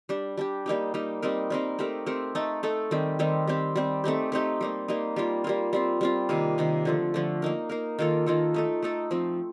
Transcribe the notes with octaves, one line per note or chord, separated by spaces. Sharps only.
G3 D4 G4
G3 D4 G4
G3 A#3 D#4 G4
G3 A#3 D#4 G4
G3 C4 D#4 A#4
G3 C4 D#4 A#4
A3 C4 G4 A#4
A3 C4 G4 A#4
A3 D#4 A4
A3 D#4 A4
D#3 G3 C4 G4
D#3 G3 C4 G4
G3 C4 G4
G3 C4 G4
A3 C4 D#4 G4
A3 C4 D#4 G4
G3 A#3 D#4
G3 A#3 D#4
G3 A#3 F4
G3 A#3 F4
G3 C4 F4
G3 C4 F4
C3 D#3 A#3
C3 D#3 A#3
D3 F3 A3
D3 F3 A3
A#3 D#4 A#4
A#3 D#4 A#4
D#3 A#3 F4 A4
D#3 A#3 F4 A4
A3 D#4 A4
A3 D#4 A4
F3 C4 D#4